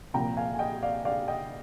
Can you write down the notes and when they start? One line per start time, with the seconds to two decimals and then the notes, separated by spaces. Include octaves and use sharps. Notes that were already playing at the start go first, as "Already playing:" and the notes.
0.14 C2 A#2 F3 G5 A#5
0.37 F5 G#5
0.54 G#5
0.59 D#5 G5
0.83 D5 F5
1.05 D5 F5
1.28 D#5 G5